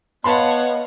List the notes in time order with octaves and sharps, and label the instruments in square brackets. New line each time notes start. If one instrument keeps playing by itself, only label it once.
[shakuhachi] B3 [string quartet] C#5 F5 F#5 [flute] D#5 [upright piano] A5 B5 C6